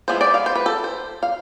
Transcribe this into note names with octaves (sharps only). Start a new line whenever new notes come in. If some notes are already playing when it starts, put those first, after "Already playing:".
F3 G#3 B3 E4 C5
D5
F5
C5
B4
A4
C5
F5